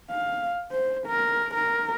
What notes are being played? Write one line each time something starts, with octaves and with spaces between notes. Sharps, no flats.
F5
C5
A#4
A#4